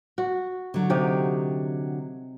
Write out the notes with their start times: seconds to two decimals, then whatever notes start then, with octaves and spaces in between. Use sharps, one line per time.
0.18 F#4
0.74 D3 F#3
0.90 C3 D#4 G4